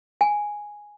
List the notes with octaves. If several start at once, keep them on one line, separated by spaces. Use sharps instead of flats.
G#5